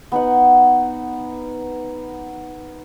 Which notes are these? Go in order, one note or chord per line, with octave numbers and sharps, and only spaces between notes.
B3 D#4 F#5